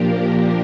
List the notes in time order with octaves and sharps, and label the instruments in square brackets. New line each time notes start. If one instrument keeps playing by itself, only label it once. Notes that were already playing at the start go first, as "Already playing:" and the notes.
Already playing: [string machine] A#2 F3 A#3 D4 G4 A#4